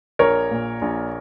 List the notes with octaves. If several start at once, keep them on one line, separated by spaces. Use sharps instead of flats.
A#1 A#4 C#5
A#2
A#1